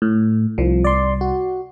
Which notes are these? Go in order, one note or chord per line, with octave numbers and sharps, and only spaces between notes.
A2
C2 F3
D5 C6
F#4